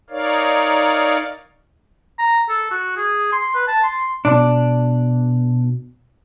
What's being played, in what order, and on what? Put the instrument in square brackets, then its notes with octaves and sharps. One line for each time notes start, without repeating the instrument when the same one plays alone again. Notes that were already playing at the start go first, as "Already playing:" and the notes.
[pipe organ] D#4 A#4 C#5 D5 F5
[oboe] A#5
A4
F#4
G#4
C6
B4
A5
C6
[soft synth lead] B2 [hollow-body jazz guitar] D4